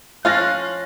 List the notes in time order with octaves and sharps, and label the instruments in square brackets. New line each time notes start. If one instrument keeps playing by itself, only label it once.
[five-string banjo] F3 C#4 F4 [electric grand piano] F5 A6 A#6 [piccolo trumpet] F#6